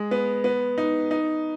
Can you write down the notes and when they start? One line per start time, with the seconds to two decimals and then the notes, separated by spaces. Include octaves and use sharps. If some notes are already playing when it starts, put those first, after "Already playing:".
Already playing: G#3
0.11 B3
0.44 B3
0.78 D#4
1.11 D#4